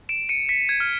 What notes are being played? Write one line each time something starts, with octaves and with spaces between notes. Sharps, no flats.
D7 E7
C#7 D#7
B6 C#7
G#6
F6